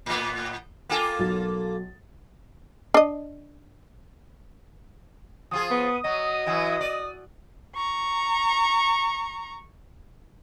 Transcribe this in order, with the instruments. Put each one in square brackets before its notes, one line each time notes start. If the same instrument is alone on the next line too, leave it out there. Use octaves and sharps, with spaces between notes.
[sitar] A2 B3
[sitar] A#3 F4 A4 [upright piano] G5 G#5
[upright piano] B1 F#3 A6
[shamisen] D4 D#5
[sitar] F3 F4 G#4 [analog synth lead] D#6
[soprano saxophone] B3
[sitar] F#3 [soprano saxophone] D#5
[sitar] E3 F#3 E4
D5
[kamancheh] A#5 C#6